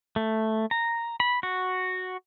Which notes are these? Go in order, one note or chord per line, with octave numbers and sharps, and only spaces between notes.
A3
A#5
B5
F#4